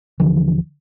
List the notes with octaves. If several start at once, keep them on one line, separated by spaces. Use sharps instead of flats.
D#1 D3 E3 F3